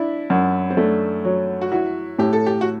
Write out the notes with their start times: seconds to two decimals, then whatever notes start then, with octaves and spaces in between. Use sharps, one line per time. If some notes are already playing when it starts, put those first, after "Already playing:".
Already playing: D4 E4
0.30 F#2
0.70 C4
0.77 A3 D4
1.25 F#3
1.61 F#4
1.72 E4 F#4
2.19 A2 G4
2.33 A4
2.46 G4
2.61 F#4